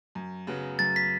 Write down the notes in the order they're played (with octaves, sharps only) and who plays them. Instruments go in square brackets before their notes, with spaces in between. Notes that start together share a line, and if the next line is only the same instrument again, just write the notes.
[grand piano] F#2
C#3 F#3 B3
[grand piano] F#2 [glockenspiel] A6
[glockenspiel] B6